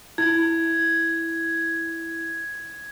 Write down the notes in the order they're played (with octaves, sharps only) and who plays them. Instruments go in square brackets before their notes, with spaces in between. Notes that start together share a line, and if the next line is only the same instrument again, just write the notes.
[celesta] E4 [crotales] G#6